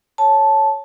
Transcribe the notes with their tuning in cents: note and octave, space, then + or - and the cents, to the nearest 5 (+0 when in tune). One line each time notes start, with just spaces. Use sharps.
C#5 +0 A5 -10